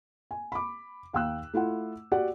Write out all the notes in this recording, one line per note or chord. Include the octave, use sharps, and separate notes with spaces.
G#5
B5 D6
D#2 F5 G5 E6 F#6
A3 E4 F4 F#5
F#4 G4 D5 F#5